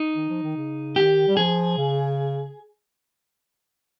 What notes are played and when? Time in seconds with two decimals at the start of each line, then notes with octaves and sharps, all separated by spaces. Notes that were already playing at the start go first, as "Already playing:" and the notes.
Already playing: D#4
0.15 D#3
0.30 F3
0.43 D#3
0.56 C#3
0.96 D#3 G4
1.28 G3
1.37 F3 G#4
1.77 C#3